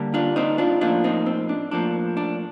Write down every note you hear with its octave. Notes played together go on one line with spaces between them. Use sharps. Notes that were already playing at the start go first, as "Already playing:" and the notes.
Already playing: D3 G3 A#3
D4 F4
C4 D#4
D4 F4
A2 F3 A#3 D4 F4
C4 D#4
C4
D4
A2 F3 A#3 D4
D4